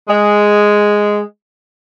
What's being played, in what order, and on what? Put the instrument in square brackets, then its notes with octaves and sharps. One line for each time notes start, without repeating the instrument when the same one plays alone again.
[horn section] G#3